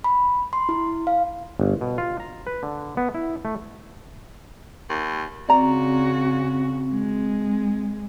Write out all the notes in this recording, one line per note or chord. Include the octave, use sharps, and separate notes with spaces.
B5
C6
E4
F5
G1
B2
F4
A#5
B4
D3
B3
E4
A3
D#2
C#3 C4 F#4 D5 A#5
G#3